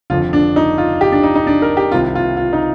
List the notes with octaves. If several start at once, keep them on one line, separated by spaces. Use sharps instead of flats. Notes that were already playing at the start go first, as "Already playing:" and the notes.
F1 F2 D3 F3 F4
D4
D#4
F4
G4
D4
D#4
D#4
D4
A#4
G4
C2 C3 D#3 F4
F4
F4
D#4